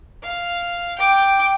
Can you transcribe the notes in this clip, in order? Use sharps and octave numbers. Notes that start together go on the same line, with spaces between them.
F5
G5 D6